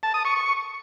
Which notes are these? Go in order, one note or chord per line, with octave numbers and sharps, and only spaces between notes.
A5
D#6
C#6
C#6